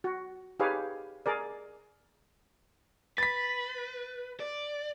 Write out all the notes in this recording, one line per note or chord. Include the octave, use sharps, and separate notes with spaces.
F#4
D#4 G4 G#4 B4 C#5 F5
G#4 A#4 D5
B4 A6 B6
D5